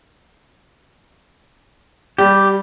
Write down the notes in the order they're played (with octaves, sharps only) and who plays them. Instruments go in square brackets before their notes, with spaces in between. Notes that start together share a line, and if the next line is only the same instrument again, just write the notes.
[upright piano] G3 [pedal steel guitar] G4